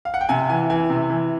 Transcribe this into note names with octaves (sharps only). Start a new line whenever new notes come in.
F5
F#5
G5
C3 G#5
E3 G#5
E3 G#5
C3
E3